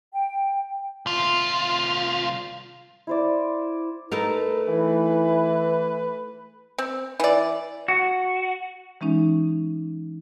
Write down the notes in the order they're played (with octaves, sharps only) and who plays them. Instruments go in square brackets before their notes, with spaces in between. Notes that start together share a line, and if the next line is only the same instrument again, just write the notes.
[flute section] G5
[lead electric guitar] C2 F4
[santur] E4 C5 D5
[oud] A3 D#4 A#4 [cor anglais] B4
[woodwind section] E3
[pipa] C4
E3 D5
[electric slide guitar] F#4
[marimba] E3 G#3 C#4 D#4